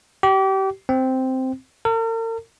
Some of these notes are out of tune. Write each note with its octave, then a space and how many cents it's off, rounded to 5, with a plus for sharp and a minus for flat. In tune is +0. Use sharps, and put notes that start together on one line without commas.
G4 -30
C4 -5
A#4 -45